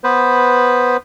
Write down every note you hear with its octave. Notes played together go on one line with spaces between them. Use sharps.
B3 B4 C5